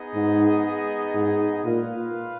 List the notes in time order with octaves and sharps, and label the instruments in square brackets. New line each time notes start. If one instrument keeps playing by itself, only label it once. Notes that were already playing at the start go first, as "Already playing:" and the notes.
Already playing: [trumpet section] B3 D#4 G#4 D#5
[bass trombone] G#2
G#2
[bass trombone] A#2 [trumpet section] F4 B4 F5